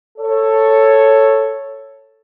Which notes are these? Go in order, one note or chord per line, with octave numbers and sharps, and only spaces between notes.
A4 C#5